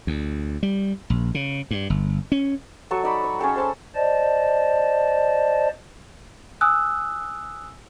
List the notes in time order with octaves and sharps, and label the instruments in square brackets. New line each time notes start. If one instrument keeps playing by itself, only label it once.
[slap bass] D2
G3
A#1
C#3
G2
G1
C#4
[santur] F#3 A4 C#6
D#4 D5 B5
C#5
C#4 G#4 A4 G5
C5 A5 E6
[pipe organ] C5 D5 D#5 A5
[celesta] G#5 D#6 E6 F#6